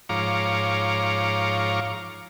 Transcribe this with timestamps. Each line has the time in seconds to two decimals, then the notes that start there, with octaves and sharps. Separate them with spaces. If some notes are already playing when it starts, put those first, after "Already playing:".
0.09 G#2 F3 C#5 F5 A#5 D6